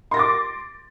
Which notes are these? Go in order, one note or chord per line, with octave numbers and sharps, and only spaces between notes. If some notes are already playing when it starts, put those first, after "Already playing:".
C6 D6 A6 A#6